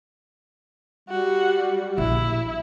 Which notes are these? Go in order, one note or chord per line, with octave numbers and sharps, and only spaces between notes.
G3 F#4
A#1 E4